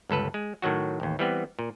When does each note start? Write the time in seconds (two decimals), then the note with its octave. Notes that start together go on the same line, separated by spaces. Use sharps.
0.10 G1 C#2 A4 B4
0.34 G#3
0.62 A2 D#3 F#3 F#4
1.00 A1 D#2
1.19 E3 G3 B3 C4
1.59 A#2